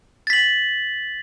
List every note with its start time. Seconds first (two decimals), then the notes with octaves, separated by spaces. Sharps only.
0.27 A6
0.30 B6
0.33 F#7